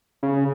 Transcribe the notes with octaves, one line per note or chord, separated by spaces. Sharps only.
C#3